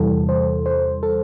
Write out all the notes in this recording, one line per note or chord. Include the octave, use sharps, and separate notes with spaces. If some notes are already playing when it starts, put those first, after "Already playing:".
Already playing: E2 C3 E3 G3 A4
C5
C5
A4